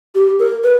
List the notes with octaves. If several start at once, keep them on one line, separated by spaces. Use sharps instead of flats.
G4
A#4
B4